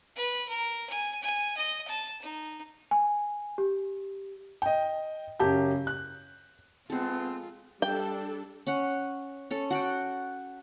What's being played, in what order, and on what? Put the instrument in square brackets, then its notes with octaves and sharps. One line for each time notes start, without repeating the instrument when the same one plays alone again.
[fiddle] B4
A#4
G#5
G#5
D#5
A5
D#4
[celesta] G#5
G4
[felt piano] D#5 G5
F#2 C#3 G4 A5 G6
F#6
[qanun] G#3 A4 [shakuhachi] B3 [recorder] C4 [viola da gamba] F4
[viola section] G3 D4 A4 [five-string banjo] G5
[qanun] C#4 F#5
C#4 A4
F#4 F#5 G5